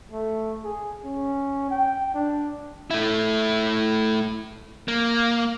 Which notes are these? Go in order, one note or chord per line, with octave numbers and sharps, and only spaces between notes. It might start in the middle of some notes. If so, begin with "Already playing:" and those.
A3
G#4
C#4
G5
D4
A3 E4
A#3